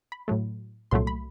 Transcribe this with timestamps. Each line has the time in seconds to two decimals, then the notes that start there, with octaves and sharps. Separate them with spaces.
0.12 B5
0.28 A2 F#3 A3
0.91 C2 A#2 F#3 A3 C6
1.07 B5